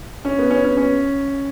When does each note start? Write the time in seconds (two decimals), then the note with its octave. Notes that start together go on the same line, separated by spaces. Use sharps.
0.25 C#4
0.38 B3
0.50 C#4
0.64 C#4
0.77 C#4